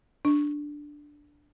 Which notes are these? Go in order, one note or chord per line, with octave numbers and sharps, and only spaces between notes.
D4